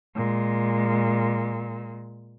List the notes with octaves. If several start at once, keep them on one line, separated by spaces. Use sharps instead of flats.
A#2 G#3